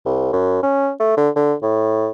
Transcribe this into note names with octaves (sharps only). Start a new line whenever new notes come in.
C2
F#2
C#4
A3
D3
D3
A2